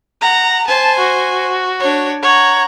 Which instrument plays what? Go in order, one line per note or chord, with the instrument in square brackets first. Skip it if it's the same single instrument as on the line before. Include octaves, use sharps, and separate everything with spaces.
[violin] F#5 [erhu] A#5
[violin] C5 G#5 [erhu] A5
[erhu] F#4
[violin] D4 C#5
[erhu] C#5 [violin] F#5 A#5